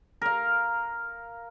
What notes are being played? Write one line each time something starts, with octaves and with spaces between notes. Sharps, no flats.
A#4 F5